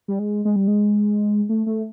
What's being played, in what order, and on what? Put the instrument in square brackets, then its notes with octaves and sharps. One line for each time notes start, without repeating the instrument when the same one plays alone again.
[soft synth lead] G3
G#3
G#3
G3
G#3
A3
A3